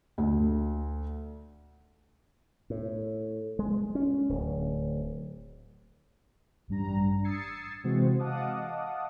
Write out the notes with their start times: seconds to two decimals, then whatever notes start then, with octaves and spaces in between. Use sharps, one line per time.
0.18 D2
2.70 A2
3.59 G#3
3.95 C#4
4.29 D1
6.68 A1 G2 G3 D4 A#5
7.24 D#6 E6 G#6 A6 C7 C#7
7.84 C3 E3 G#3 C4 F#4 C5
8.19 D#5 F5 F#5 A5 D6 D#6